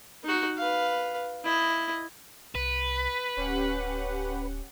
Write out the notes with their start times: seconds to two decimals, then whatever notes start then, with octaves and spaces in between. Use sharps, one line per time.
0.24 D#4 F#4
0.57 B4 F5
1.44 E4 D#5
2.55 C2 B4
3.37 D1 C#4 G4 F#5